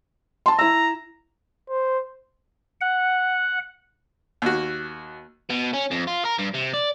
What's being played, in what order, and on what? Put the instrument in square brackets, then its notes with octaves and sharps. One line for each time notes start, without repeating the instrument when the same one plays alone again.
[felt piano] A5 C6
[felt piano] E4 E6 [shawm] A#5
[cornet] C5
[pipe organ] F#5
[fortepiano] D#2 F#4
[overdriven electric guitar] B2
C#4
F2
F4
A#4
G2
C3
D5